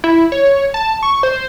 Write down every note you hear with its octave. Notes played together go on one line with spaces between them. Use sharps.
E4
C#5
A5
C#6
C5